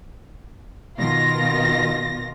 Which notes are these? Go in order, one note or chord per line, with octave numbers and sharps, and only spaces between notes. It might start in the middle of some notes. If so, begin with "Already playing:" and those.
B2 D#3 F4 A#6